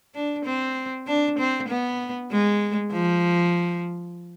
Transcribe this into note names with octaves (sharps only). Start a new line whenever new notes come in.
D4
C4
D4
C4
B3
G#3
F3